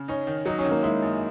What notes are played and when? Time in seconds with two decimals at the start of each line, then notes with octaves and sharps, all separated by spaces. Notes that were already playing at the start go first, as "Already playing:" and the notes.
Already playing: C#3
0.08 C#4 D#4
0.27 D#3
0.45 F#3 D#4
0.58 C#4
0.65 D#3
0.71 A#3
0.83 G#3 E4
1.02 F#2